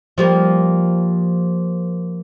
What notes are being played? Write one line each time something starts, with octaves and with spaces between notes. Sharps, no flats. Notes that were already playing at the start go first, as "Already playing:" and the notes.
F3 G3 A#3